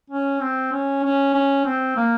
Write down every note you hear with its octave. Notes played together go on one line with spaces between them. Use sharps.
C#4
C4
C#4
C#4
C#4
C4
A#3